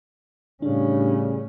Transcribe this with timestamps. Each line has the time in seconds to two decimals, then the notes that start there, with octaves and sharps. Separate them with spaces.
0.62 A2 C#3 G3 C#4 D4